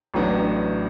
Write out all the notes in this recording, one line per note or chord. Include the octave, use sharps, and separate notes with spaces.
A1 A2 F#3 B3 D4